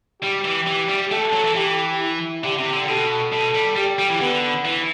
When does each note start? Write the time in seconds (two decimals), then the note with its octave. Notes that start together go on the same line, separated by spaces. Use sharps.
0.22 G3 G4
0.45 E3
0.67 E3
0.89 G3
1.11 A3 A4
1.33 F#3
1.44 E3
1.55 E3 G4
2.00 E4
2.44 D3 G4
2.59 C3
2.73 D3
2.88 B2 A4
3.32 B2 A4
3.55 G3
3.76 G3 G4
3.99 G3
4.10 E3
4.20 D3 B3
4.65 E3